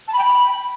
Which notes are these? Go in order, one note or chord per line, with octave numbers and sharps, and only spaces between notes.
A5
B5
G5
B5